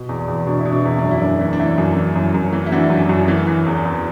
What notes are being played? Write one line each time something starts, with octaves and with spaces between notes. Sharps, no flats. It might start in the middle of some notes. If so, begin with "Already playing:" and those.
Already playing: B2
E2
E2
B2 D4
E4
B2
D4
E2 E4
F#2 D4
E4
F#2 D4
E3
D4
E3 E4
F#2
E3
F#2
F#2
E3
E4
E3 D4 F#4
F#2
F#2
E3
E3
E2
E2